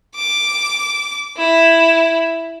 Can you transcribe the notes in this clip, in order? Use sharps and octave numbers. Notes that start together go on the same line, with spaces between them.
D6
E4